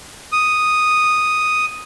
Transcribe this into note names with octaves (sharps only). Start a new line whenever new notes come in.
D#6